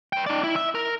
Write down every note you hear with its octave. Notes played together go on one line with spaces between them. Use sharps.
B4 G5
D#4 D5
E4
E5
A#4